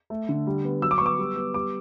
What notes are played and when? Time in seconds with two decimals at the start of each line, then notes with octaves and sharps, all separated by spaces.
0.10 A3
0.29 D3
0.47 G3
0.65 B3
0.82 F#3 E6
0.91 D6
0.98 B3 C#6
1.06 D6
1.18 G3
1.36 B3
1.54 G3 D6